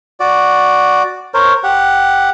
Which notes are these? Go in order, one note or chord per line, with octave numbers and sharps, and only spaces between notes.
F#4 D5
A#4 C5 C#5
G4 F#5